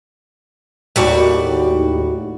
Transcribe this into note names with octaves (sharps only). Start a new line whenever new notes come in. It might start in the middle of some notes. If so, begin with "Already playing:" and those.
D#2 A2 G3 F#4 D5